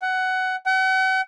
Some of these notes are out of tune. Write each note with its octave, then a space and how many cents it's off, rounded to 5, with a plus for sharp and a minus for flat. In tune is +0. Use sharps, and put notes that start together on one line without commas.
F#5 +15
F#5 +40